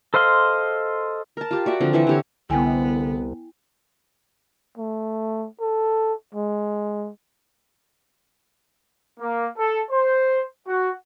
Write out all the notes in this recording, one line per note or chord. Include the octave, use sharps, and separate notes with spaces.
A4 C5 D#5 F5 C6
A#4 A5
F4 G4
F#4 D5 E5
D3 F3 C4
E3 E5 F#5
D3 G4 C#5
C2 D3 B3 E4 G5 G#5
A3
A4
G#3
A#3
A4
C5
F#4